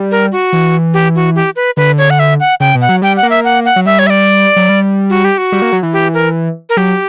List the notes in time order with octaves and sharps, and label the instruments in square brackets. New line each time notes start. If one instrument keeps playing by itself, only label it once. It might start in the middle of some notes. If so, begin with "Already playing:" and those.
Already playing: [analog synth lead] G3
[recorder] A#4
F#4
[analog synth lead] E3
[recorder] G4
F#4
G4
B4
[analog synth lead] D3 [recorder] B4
[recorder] C#5
F#5
E5
F#5
[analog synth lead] C#3 [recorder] G5
[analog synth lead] B2
[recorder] F#5
[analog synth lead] F#3
[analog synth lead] G3 [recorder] G5
[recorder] F#5
[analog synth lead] A#3
[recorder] E5
F#5
F#5
[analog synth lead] F#3
[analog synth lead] G3 [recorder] E5
[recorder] C#5
E5
D5
[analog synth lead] F#3
G3
[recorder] F#4
G4
F#4
[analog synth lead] G3
A#3
F#3
E3
[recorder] G4
A#4
A#4
[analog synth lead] F#3 [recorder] G4